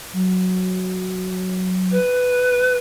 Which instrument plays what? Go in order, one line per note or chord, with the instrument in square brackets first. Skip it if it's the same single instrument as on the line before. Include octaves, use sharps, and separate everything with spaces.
[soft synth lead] F#3
[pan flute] B4